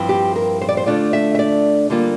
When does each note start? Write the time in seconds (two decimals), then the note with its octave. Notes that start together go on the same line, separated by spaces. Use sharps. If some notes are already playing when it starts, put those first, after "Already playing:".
Already playing: G2 F3 C4 E4
0.09 G4
0.36 A#4
0.61 C5
0.69 D5
0.77 C5
0.86 D3 A3 D4 F4 D5
1.13 E5
1.35 E5
1.39 D5
1.90 D3 G3 A#3 D4 F4